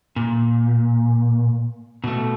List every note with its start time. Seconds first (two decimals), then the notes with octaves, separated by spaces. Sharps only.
0.16 A#2
2.04 B2 A3